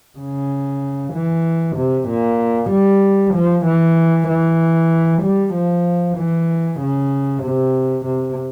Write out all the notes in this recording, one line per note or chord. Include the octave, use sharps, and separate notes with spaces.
C#3
E3
C3
A#2
G3
F3
E3
E3
G3
F3
E3
C#3
C3
C3